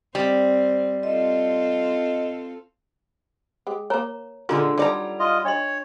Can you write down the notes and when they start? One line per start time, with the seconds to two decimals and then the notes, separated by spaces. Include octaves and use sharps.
0.15 G3 C4 C5
1.03 C4 F4 A4 D#5
3.67 G#3 G4
3.90 A#3 A#4 C#5 A#5
4.49 A#2 D3 G#3 F4 A#4 C6
4.78 D#3 F#3 G3 D5 A#5
5.19 F4 D#5
5.45 D4 C#5 D#5 C6